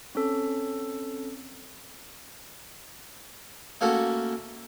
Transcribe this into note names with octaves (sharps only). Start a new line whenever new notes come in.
C4 C#4 A4
A3 A#3 C#4 F#4 A4